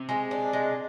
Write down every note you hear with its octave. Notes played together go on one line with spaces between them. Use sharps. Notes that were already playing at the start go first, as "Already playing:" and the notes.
Already playing: C3
G#3
D4
G#3